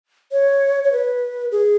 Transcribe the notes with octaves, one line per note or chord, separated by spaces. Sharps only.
C#5
C#5
B4
G#4